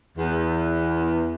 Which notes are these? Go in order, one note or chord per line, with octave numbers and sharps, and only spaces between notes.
E2